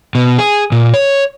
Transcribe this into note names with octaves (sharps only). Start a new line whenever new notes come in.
B2
G#4
A#2
C#5